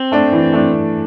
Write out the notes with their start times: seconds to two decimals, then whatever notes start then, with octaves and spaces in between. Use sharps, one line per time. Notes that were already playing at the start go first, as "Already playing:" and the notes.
Already playing: C4
0.12 A3 D4
0.32 E3
0.53 A3 D4